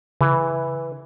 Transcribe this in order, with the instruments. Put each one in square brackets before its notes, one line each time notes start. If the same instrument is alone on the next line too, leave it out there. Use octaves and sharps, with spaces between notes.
[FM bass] C#3 [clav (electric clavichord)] E3